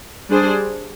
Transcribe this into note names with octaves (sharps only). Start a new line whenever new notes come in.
G3 D4 G#4 C5